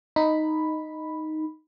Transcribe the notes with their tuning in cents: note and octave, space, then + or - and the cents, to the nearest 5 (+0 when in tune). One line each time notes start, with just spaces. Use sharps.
D#4 +0 B5 +0